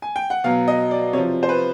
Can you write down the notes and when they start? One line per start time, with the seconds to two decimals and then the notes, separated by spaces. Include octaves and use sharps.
0.02 G#5
0.16 G5
0.30 F#5
0.44 B2 F#3 F5
0.68 D#5
0.91 D5
1.13 C3 C#5
1.18 F3
1.43 C5
1.49 B4